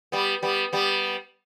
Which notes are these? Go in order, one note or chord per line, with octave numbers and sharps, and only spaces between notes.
G3 B3
G3 B3
G3 B3